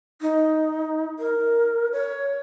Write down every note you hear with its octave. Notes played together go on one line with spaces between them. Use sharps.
D#4
A#4
C#5